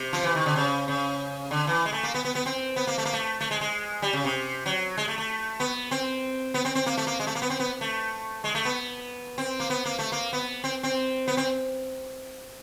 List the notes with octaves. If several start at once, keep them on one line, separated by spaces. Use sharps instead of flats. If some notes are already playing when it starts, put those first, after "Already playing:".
Already playing: C3
F3
E3
D#3
D3
C#3
C#3
D3
E3
G#3
A3
A#3
B3
B3
B3
C4
B3
A#3
A3
A#3
A3
A3
G#3
G#3
G3
C#3
C3
F#3
G#3
A3
A3
B3
C4
B3
C4
C4
A#3
A3
A#3
G#3
A3
A#3
B3
C4
B3
A3
G#3
A3
B3
C4
A#3
B3
A#3
A3
A#3
B3
C4
C4
B3
C4